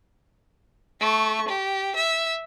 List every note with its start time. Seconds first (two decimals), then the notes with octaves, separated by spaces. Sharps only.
1.00 A3 C#6
1.49 G4
1.96 E5